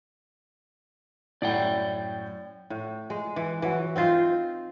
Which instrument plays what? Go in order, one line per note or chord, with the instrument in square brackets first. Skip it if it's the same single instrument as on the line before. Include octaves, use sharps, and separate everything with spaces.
[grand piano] F#2 A2 [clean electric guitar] D5 F#5 G5
[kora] A2
G#3
E3
E3 F#3
C4 D#4 F4 C5